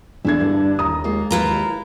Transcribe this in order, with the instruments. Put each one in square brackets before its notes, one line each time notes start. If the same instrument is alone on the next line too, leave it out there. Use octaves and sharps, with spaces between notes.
[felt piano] E2 G#6 [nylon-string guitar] D3 E4 [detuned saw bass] D4
[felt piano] G2
[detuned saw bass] D#2 [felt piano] A#5 D#6
[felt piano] G#3 [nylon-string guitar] A#3 F4
[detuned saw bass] D#2 [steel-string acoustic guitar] E4 F4 A#5 [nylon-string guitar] A#4 B4